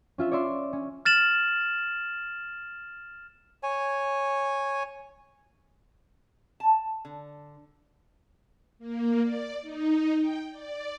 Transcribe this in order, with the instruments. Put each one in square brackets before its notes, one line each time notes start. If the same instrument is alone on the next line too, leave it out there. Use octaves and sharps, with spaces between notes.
[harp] C#4 F4 E5
C#5 D5 E5 C6
C#4
[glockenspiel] F6 A6 E7 F#7
[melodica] C#5 G#5
[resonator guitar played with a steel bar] A5
D3
[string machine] A#3
D5
D#4
G5
D5